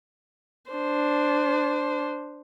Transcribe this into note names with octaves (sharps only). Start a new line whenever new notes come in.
D4 C5